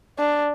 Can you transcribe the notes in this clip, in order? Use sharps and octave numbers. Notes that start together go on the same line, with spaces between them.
D4